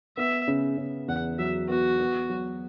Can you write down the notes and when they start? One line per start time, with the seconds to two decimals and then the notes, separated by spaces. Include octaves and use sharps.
0.17 B3 E5
0.48 C#3
0.78 C#3
1.08 E2 F#5
1.38 F#3 E5
1.69 B3 F#4
1.99 B3
2.29 F#3